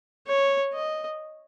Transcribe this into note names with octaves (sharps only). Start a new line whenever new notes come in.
C#5
D#5